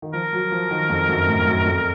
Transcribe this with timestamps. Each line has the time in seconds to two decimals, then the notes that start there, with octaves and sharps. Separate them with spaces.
0.02 D#3
0.13 F3 A#4
0.33 F#3
0.52 F3
0.71 D#3
0.89 F2
1.08 F#2
1.27 A2
1.39 A2
1.46 F#2
1.66 F2